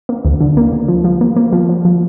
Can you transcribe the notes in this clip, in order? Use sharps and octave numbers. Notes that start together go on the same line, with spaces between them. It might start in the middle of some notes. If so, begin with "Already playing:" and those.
A#3
D2
D3
A#3
D3
F3
F3
A#3
A#3
F3
F3
F3